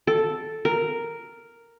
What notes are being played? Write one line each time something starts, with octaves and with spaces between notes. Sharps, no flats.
A4
A#4